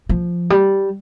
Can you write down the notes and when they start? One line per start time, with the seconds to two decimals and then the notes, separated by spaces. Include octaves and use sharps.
0.09 F3
0.50 G3